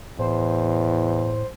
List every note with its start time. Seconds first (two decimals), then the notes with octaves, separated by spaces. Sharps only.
0.19 E2 A2 C5